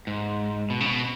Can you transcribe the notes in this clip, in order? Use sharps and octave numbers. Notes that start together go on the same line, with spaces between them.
G#2
B2
C#3
B2